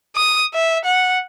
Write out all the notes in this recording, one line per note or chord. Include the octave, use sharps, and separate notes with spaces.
D#6
E5
F#5